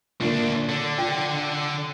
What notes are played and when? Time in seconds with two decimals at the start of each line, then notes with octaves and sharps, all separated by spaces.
0.20 D2 A#2 D3 A#3 D4
0.69 D3 D4
0.98 F4 G5